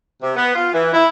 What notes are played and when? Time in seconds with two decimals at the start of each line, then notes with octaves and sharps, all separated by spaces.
0.22 C3
0.36 B3
0.55 F4
0.73 E3
0.93 E4